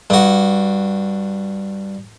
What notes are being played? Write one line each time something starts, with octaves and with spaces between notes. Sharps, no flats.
G2 F#4